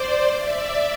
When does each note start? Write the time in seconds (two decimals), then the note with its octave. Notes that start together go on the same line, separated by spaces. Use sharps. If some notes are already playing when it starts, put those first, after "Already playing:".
Already playing: C5 D5
0.38 D5 E5